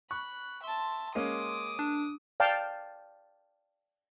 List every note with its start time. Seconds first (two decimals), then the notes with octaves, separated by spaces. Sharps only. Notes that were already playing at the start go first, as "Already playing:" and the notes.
0.11 B5 C#6 F#6
0.64 E5 A5 C6
1.15 G#3 A#3 C#4 D6 D#6
1.79 D4
2.40 D5 F5 G5 A5